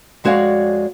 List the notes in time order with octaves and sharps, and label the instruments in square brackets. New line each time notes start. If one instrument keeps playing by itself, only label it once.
[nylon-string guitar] F2 G#3 F#4 C#5 D5 F5